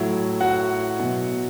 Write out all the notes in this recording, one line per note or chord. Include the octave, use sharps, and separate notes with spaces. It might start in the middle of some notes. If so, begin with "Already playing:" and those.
Already playing: A2 F#3 E4 E5
F#4 F#5
B2 F#3